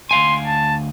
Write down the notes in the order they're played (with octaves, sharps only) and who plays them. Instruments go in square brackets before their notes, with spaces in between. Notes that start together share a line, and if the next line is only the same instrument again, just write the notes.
[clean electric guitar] D2 F5 G#5 [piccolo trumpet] C6
[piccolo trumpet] A5